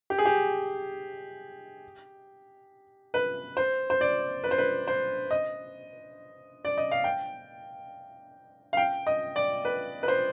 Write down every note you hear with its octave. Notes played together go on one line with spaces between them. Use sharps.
G4
G#4
G4
B4
C5
C5
D5
B4
C5
B4
C5
D#5
D5
D#5
F5
G5
F5
G5
D#5
D5
B4
B4
C5